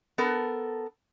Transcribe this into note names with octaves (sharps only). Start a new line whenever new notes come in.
B3 A4 A#4